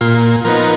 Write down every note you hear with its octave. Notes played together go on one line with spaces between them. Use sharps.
A#2 F4
F3 B3 D#4 A#4